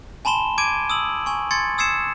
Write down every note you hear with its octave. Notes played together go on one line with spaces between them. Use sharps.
G#5 A5 B5 C6 E7 G7
D6 G#6 D7 D#7
D#6 E6 F#7
G#5 C#6
C6 G#6 A6 C#7
D#6 E6 G#6 C7 C#7 E7